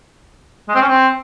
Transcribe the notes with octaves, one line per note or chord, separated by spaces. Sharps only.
G#3
C4
C#4
C4